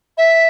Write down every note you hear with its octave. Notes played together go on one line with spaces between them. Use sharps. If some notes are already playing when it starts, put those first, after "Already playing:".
E5